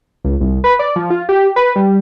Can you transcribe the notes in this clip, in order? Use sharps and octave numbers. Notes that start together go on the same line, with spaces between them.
C#2
C2
B4
D5
F3
F4
G4
B4
G3